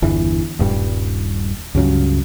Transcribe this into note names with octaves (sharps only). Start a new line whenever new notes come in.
G1 E2 E3
D#1 G2 G3
C#2 G2 C#3 F#3